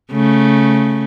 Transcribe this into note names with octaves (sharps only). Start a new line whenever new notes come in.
C#3 A3